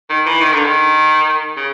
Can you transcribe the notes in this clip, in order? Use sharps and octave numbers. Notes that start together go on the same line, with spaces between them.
D#3
E3
D#3
D3
D#3
C#3